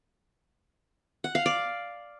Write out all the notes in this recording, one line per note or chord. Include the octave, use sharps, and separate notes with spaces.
F#5
F5
D5